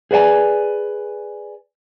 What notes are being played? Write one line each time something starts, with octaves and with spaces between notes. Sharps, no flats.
G#4 B4 D5 F5 G#5